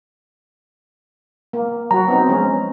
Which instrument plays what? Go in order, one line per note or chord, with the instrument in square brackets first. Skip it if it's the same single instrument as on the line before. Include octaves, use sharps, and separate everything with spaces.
[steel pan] A#3
[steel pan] F#3 F#4 [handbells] A#5
[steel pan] B3 C4 D#4
F3 G#3 C#4